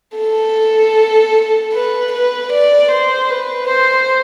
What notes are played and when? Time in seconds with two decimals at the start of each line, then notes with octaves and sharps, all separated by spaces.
0.18 A4
1.73 B4
2.12 B4
2.52 D5
2.91 C5
3.30 B4
3.68 C5